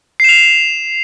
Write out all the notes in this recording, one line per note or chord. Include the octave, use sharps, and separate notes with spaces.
C7 E7 F7